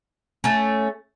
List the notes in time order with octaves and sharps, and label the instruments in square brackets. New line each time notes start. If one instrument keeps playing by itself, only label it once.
[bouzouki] A3 C#4